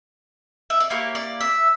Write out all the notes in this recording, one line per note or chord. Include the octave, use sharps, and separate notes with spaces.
E5
D5
A#3 E4 G4 C#5
D5
E5